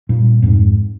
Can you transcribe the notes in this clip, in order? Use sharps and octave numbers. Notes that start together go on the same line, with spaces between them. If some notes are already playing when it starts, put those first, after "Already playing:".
G2 A#2
F2 G#2